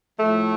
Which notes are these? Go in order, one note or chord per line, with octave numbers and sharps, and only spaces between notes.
A2 F3 A3